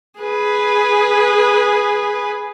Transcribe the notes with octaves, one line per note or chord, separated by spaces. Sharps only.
G#4 B4